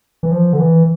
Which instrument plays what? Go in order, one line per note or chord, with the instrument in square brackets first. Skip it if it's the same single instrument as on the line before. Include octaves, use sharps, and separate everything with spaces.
[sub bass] E3
F3
D3
E3